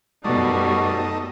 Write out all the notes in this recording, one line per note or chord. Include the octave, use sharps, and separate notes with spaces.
F#2 B2 G3 A3 D#4 F#4 D5